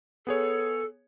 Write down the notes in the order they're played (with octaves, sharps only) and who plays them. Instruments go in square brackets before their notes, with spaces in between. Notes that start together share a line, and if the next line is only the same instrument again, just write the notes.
[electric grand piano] B3 G#4 C#5 [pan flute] A4